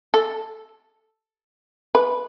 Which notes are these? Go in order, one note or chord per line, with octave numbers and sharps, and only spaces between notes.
A4
B4